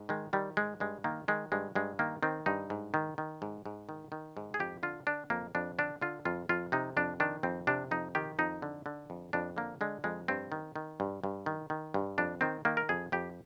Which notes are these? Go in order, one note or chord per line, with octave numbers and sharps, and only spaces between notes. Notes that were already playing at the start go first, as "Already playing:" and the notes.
Already playing: G#2
D#3 G#3
D#3 G3
G#2 G#3
G2 G#3
D#3 A#3
D#3 G#3
G2 G#3
G2 G#3
D#3 A#3
D#3 C4
G2 D#4
G#2
D#3
D#3
G#2
G#2
D#3
D#3
G#2
G#4
F2 G4
D3 F4
D3 D4
F2 A#3
F2 D4
D3 D4
D3 F4
F2 F4
F2 F4
C3 D#4
F2 D4
D#3 D4
F2 C4
C3 D4
F2 D#4
D#3 G4
F2 D#4
D3
D3
F2
F2 D4
D3 A#3
D3 G#3
F2 G#3
G2 C4
D#3
D#3
G2
G2
D#3
D#3
G2
F2 D4
D#3 C4
D#3 A#3
A#4
F2 G#4
F2 G4